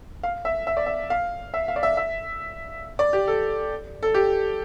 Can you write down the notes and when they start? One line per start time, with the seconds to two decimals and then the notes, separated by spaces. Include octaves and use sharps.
0.23 F5
0.45 E5
0.67 E5
0.77 D5
0.86 E5
1.10 F5
1.54 E5
1.68 F5
1.76 D5
1.83 E5
1.97 E5
2.99 D5
3.13 G4
3.28 A4
4.03 A4
4.14 G4